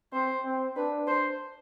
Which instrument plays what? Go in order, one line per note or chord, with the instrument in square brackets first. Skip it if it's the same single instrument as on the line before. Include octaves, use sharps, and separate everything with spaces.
[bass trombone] C4 [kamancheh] C5
[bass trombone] C4
[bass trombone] D4 [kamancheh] B4
[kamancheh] C5